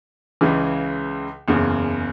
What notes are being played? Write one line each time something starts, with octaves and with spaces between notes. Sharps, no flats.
C#2 C#3 E3
F#1 E2 C#3